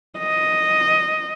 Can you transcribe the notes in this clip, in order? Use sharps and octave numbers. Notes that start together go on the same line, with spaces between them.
D#5